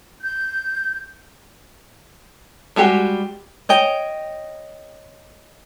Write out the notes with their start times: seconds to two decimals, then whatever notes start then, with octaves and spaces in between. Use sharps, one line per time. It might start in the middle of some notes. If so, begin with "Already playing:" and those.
0.21 G6
2.76 G3 G#3 F#4 G4
3.69 C#5 D#5 G5